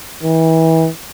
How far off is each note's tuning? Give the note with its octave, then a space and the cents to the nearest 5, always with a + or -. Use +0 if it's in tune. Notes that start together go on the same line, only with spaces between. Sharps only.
E3 -30